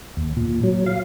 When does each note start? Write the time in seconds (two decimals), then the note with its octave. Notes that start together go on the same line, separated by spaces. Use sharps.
0.17 D#2
0.37 A#2
0.63 F#3
0.86 F5